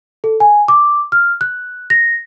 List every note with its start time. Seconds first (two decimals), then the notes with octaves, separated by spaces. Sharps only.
0.24 A4
0.40 G#5
0.68 D6
1.12 F6
1.41 F#6
1.90 A#6